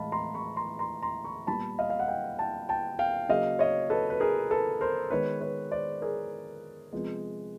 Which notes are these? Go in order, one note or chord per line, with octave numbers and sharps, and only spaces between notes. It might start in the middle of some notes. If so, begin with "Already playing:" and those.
Already playing: A2 E3 G#3 D#5 F5 A5 B5
A#5 C6
B5 C#6
A#5 C6
A#5 C6
A#5 C6
B5 C#6
A#2 G3 B3 A5 B5
D#5 F5
F5
F#5
F5 G5
G5 A5
G5 A5
F5 G5
C#3 F#3 A#3 D#5 F5
C#5 D#5
A4 B4
B4
G#4 A#4
A4 B4
A#4 C5
D#3 G#3 B3 B4 C#5
B4 C#5
C5 D5
G#4 A#4
C3 F3 G#3 B3